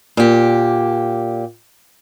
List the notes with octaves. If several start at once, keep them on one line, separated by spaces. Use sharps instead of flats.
A#2 G4